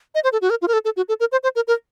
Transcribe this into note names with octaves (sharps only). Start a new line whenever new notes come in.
D#5
C5
A4
F#4
A#4
F4
A#4
A4
A4
F#4
A4
A#4
C5
C5
A#4
A#4